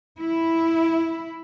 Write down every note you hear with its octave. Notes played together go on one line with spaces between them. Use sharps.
E4